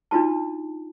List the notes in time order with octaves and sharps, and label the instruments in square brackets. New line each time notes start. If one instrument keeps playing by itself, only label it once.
[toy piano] D4 D#4 F4 F#4 A5